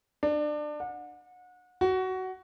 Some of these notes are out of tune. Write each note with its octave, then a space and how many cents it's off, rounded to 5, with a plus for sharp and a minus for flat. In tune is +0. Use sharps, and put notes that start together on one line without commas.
D4 +25
F#5 -30
F#4 +15